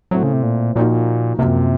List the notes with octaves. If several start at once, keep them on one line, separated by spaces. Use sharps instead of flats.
A2 F#3 A3 C4
C#3
C3
A#2
A#2 F3 A#3 D#4 F#4
F#2 C3 F3 A#3